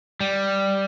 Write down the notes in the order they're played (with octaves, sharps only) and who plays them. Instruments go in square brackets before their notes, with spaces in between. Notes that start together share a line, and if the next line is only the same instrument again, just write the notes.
[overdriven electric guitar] G3